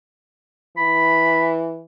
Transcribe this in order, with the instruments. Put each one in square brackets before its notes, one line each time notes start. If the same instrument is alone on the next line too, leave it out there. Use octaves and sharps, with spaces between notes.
[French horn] E3 [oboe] B5